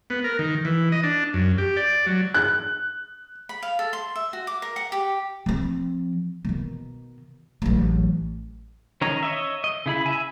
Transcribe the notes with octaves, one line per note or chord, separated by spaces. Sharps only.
B3
A#4
D#3
E3
D#5
D4
F#2
G4
D5
F#3
F#6
B5
F5
A4
C6
E5
F#4
D6
A#4
F#5
G4
F3 C4
B2 D#3
A1 F#3
D#3 C#4 C#5 D#5 A#5
C#5 D#5 E5
D#5
C#3 E4 B5
E5 G#5